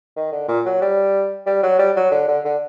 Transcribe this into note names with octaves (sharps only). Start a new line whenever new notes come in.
D#3
D3
A#2
F#3
G3
G3
F#3
G3
F#3
D3
D3
D3